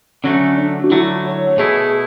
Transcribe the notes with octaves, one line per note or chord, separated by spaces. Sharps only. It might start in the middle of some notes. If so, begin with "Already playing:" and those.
D3 F#3 A3 C#4
D4
F#4
D3 F#3 A3 E4
C#5
B2 A3 E4 G#4